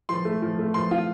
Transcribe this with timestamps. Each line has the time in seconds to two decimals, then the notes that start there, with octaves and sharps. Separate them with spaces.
0.09 F3 C6
0.25 A3
0.42 F3
0.59 A3
0.74 F3 C6
0.91 F4